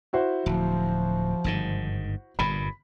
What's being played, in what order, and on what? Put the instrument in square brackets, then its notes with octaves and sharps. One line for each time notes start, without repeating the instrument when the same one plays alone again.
[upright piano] E4 F#4 C5
[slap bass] D1 [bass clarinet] F3
[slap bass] G1 G#2 D#3
[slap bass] G1 G2 A#2 [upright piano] B5